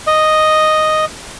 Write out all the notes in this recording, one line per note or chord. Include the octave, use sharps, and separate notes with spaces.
D#5